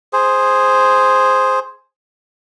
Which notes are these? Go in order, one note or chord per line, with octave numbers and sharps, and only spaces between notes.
G#4 C5